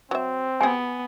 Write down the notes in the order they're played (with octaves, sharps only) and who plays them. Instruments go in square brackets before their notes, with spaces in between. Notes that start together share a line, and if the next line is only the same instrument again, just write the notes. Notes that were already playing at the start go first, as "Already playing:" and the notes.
[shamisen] F#3 E5 [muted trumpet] C4
[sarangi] B3 [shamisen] G4 G#4 [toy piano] G#5